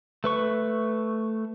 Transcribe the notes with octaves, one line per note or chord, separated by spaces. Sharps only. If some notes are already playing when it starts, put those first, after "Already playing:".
A3 B4 C#6